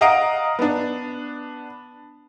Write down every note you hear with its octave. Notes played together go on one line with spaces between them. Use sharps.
D#5 F5 F#5 A#5 D#6 D7
B3 D4